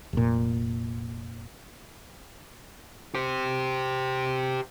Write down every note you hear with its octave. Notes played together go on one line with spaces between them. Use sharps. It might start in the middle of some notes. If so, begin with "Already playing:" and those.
F1 A#2
G4 C5